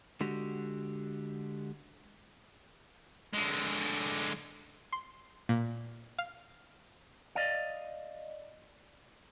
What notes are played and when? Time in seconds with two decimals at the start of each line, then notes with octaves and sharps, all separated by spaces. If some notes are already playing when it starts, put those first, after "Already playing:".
0.21 D3 G#3 F#4 G4
3.33 D3 G#3
4.93 C6
5.49 A#2
6.19 F5
7.35 D5 D#5 F5